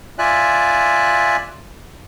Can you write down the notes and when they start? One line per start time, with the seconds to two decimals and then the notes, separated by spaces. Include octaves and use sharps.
0.19 F4 D5 E5 G#5 F#6